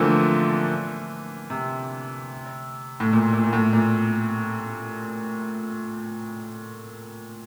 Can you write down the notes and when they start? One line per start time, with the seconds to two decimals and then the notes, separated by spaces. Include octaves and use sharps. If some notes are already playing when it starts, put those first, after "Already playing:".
Already playing: D3 E3 F3 A3 A#3 C4
1.50 C3
3.00 A2
3.13 A#2
3.33 A#2
3.43 A#2
3.53 A2
3.73 A#2